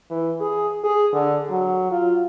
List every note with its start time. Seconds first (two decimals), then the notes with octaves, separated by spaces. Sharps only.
0.10 E3
0.40 G#4
0.84 G#4
1.13 D3
1.49 F#3
1.91 F4